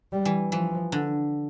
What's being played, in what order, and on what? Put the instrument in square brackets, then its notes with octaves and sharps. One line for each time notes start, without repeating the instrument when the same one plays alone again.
[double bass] G3
[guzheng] E3
[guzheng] E3 [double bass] F3
[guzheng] D3